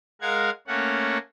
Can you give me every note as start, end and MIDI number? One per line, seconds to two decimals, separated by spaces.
0.21 0.50 56
0.21 0.50 70
0.21 0.50 77
0.21 0.50 78
0.21 0.50 92
0.67 1.18 57
0.67 1.18 58
0.67 1.18 61
0.67 1.18 73
0.67 1.18 78